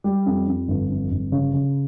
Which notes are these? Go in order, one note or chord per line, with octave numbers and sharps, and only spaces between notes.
G3
F2
F2
G1
F2
G1
C#3
C#3